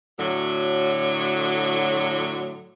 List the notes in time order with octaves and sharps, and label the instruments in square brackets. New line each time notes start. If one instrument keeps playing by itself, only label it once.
[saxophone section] A2 D3 F#3